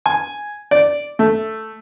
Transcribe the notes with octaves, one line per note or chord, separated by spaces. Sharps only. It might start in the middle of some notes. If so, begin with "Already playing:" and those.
G#5
D5
A3